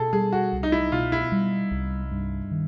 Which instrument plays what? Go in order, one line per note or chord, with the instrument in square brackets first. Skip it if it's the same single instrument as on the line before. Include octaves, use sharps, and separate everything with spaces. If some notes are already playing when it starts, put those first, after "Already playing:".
Already playing: [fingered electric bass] B2 [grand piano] G#4 A4
[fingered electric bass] G3 [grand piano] G#4
[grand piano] F#4
[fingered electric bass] C2
[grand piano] D#4
E4
[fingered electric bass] B2 [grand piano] F4
[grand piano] E4
[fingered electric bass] G3
C2
G2
D#3